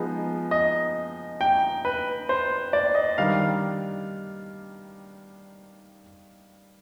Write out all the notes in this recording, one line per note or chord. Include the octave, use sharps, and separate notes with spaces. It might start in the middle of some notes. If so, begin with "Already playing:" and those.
Already playing: F3 G#3 B3 D#4 D#5
D#5
G5
B4
C5
D5
D#5
D#3 G3 D4 F5